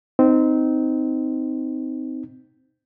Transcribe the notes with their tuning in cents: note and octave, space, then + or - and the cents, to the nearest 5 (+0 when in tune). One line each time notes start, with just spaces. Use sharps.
C4 -15 D#4 +0